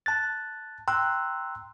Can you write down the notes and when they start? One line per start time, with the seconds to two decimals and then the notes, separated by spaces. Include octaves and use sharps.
0.06 A5 F#6 A6
0.88 G5 A#5 C6 E6 F#6